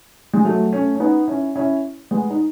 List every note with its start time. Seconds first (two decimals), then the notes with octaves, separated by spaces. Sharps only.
0.34 G#3
0.45 F#3 A3
0.73 A3 C#4
0.95 C#4
1.00 B3 D#4
1.28 C#4 E4
1.56 C#4 E4
2.11 G#3 B3
2.30 D#4